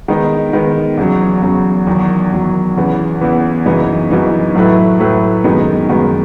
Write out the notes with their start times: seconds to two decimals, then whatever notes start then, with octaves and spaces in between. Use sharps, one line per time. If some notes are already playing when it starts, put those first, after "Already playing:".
0.08 D#3 G#3 B3 D#4
0.53 D#3 G#3 B3 D#4
0.97 E2 C#3 F#3
1.42 E2 C#3 F#3
1.87 E2 D#3 F#3
2.32 E2 D#3 F#3
2.77 E2 C#3 E3 B3
3.21 E2 C#3 E3 B3
3.66 F#2 C#3 E3 B3 D#4
4.10 F#2 C#3 E3 B3 D#4
4.55 A2 F#3 A3 E4 B4
4.99 A2 F#3 A3 E4 B4
5.44 F#2 D#3 G#3 B3 D#4
5.89 F#2 D#3 G#3 B3 D#4